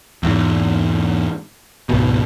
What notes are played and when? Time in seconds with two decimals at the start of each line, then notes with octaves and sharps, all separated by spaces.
0.23 E2 G#2
1.89 G#1 C#2 B2